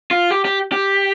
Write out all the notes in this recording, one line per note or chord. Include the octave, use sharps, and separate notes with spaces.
F4
G4
G4
G4